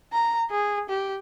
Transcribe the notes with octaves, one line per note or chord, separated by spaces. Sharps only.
A#5
G#4
G4